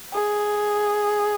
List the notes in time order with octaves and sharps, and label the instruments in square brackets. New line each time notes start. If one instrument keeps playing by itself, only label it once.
[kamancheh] G#4